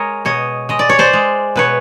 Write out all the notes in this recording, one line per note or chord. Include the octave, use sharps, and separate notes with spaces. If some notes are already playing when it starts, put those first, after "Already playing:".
Already playing: G#3 A#4 C#5 D#5
B2 C#5 D#5
G#3 D#5
D5
C#5
C5 D5
G#3
B2 B4 C#5